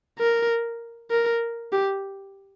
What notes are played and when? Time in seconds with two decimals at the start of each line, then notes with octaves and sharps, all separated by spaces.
0.19 A#4
1.11 A#4
1.72 G4